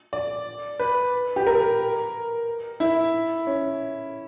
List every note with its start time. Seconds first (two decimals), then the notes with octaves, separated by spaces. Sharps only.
0.13 D5
0.80 B4
1.36 G4
1.47 A#4
2.80 E4
3.47 C#4